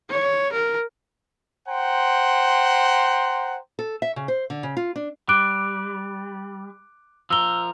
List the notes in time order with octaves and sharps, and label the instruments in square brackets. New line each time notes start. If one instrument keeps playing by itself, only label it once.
[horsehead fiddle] C#5
A#4
[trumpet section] C5 F#5 G5 A#5 C6
[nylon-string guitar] A4
E5
C#3
C5
D3
C#3
F4
D4
[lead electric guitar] G3 [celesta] D6 F#6 D7
[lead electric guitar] F3 A#4 [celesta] E6 G7